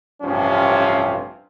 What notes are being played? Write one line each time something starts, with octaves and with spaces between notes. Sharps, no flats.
A1 G2 C3 F3 C#4